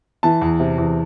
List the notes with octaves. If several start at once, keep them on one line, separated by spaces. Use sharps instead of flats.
E3 A5
E2
C3
E2